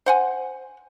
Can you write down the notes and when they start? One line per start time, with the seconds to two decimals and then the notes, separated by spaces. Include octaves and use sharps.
0.06 C5 F#5 G#5